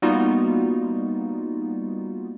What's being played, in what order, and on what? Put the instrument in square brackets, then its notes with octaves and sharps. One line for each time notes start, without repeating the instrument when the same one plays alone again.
[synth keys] G3 A#3 B3 D#4 F4 F#4